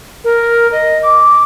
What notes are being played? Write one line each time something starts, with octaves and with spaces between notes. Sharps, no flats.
A#4
D#5
D6